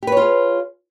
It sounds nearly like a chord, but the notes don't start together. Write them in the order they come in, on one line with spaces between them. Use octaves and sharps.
G4 B4 C#5 F4 G#4